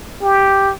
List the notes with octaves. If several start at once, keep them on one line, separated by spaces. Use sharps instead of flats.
G4